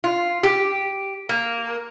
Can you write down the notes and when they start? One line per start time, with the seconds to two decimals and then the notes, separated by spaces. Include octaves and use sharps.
0.04 F4
0.43 G4
1.29 A#3